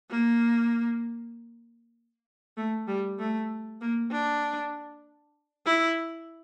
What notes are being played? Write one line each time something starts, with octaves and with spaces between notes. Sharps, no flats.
A#3
A3
G3
A3
A#3
D4
E4